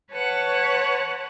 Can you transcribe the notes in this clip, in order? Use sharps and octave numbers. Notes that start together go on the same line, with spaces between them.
B4 C#5 F#5 A5